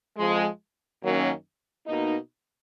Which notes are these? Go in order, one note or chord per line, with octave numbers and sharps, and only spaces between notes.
F2 F3 G#3
F#2 D#3 F#3 A#3 C#4
B2 A#3 D#4